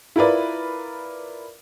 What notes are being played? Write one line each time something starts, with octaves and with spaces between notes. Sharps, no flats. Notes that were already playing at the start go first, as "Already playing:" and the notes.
E4 F4 A#4 B4 D5